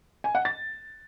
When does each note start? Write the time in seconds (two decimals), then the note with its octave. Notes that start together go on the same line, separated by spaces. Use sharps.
0.24 G#5
0.35 F#5
0.45 A6